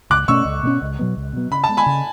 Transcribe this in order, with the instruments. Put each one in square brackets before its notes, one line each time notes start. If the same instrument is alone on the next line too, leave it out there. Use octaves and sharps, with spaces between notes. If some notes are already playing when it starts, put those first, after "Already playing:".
[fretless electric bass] C#2 [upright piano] D6 F#6
[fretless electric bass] B2 A3 C#4 [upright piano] C#6 E6
[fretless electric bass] C#2
B2 A3 C#4
C#2
B2 F#3 B3
C#2
B2 F#3 B3
[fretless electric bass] C#3 [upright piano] B5
[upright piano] A5
[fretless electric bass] G#3 B3
[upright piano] G#5 B5
[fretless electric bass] C#3